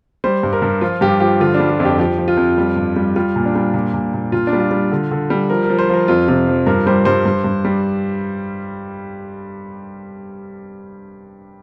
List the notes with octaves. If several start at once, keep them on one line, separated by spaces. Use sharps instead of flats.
G3 C5
G2
A#4
G2
F3 F4
G2 G4
F3 G4
D3 F4
D4
G3
F4
F2
G4
F3 G4
F3
F4
F2
G3
G2
G3
G3 F4
A#2
D4
G3
A#2
A#2
A#2
A#2 F4
D4
G3
F4
G3
D3
D3
G3
F3 A#4
F3 A#4
C5
F3 A#4
F2 F4
C3 F4
F3
G2 A#4
G3 C5
G2 C5
G2
G2
G3